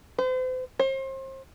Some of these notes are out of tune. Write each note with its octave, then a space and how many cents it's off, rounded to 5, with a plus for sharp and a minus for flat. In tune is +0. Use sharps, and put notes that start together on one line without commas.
C5 -40
C5 +35